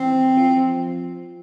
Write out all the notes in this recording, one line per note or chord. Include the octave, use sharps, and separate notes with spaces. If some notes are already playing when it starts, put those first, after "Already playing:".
Already playing: E3 C4
F3